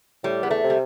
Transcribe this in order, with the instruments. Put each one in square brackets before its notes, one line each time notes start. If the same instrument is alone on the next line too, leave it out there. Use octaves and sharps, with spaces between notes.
[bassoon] A2 [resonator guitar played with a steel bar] G3
[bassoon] E2 [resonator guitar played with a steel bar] B3
[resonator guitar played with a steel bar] A3
[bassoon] C3
[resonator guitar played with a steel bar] G3